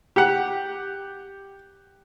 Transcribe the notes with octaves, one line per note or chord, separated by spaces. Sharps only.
G4 F#5